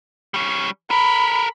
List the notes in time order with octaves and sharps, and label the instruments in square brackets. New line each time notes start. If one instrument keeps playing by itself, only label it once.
[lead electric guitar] G3 C#4
[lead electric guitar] A4 A#4 [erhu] B5